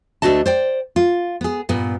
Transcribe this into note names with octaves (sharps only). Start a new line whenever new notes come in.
D2 A3 D4 F#4 D#5 A5
C5 D5 G5
F4
B3 G#4
G2 A#2 B3